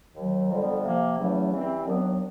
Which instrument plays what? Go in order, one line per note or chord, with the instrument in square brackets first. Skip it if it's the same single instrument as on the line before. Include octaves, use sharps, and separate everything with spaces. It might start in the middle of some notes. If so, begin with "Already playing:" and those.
[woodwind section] D#2 D#3 F#3
F2 D3 G3 B3
C3 F3 A#3
E2 C#3 F#3 A3 C#4
E3 G3 C4
D#2 D#3 F#3 B3 D4